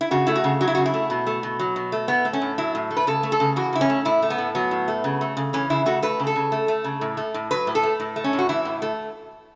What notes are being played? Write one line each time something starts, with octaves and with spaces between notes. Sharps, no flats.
E4
C#3 F#4
A3 E4
F#4
C#3
F#3 F#4
E4
C#3 F#4
E4
A3
B2
A3
B2
F#3
B2
A3
A2 B3
A3
C#4
A2
F#3 E4
A2
A3
B4
C#3 A4
A3
A4
C#3
E3 F#4
C#3 E4
C#4
A3
A2 E4
A3
B3
A2
F#3 B3
A2
A3
C#3
A3
C#3
E3 C#4
C#3 E4
A3 F#4
A3 B4
C#3
A4
C#3
A3
A3
C#3
A2
A3
A2
F#3 B4
A2
A4
A3
A2
A3
C#4
A2
F#4
E3 E4
A2
A3